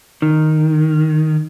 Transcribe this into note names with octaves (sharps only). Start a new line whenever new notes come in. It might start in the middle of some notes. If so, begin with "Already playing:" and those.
D#3